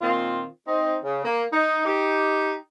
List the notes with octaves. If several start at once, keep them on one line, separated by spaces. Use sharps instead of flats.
A#2 D#3 C4 F4
C4 D#4
C#3
A#3
D#4
D#4 G4